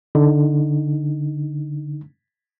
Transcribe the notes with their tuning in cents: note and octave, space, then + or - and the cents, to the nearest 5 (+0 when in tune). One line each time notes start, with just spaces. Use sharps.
D3 -5 D#4 +0